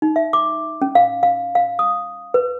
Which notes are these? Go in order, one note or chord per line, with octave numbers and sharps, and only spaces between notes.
D#4
E5
D6
C#4
F5
F5
F5
D#6
B4